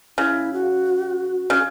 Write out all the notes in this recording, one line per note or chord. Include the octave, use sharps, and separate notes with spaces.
C#3 E4
F#4
C#3